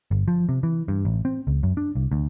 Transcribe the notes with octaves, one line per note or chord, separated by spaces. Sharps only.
G1
F3
C3
E3
G2
A1
C4
C#2
F#2
D4
C2
D2